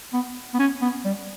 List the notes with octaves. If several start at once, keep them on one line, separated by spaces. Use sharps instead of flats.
B3
B3
C#4
B3
G3